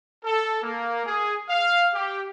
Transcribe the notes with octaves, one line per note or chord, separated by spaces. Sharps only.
A4
A#3
G#4
F5
G4